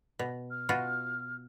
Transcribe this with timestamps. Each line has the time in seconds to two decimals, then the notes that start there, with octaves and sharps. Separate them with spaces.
0.19 B2
0.51 F6
0.69 B2 F4 F#4